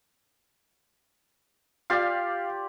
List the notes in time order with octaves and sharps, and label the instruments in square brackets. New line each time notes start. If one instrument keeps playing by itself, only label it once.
[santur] F4 G4 D5 [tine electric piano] F5